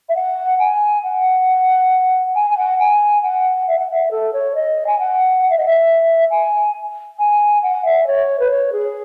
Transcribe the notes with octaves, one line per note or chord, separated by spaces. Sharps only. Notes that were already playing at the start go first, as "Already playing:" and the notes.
E5
F#5
G#5
F#5
G#5
G#5
F#5
G#5
F#5
E5
F#5
E5
A4
C#5
D#5
G#5
F#5
F#5
E5
D#5
E5
G#5
G#5
F#5
E5
C#5
B4
C#5
G#4